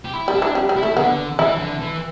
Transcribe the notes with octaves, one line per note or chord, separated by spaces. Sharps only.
G4
E4
G3
D4
E3
G3
G3
E4
A3
D3 B3
E3 E4
D3
E3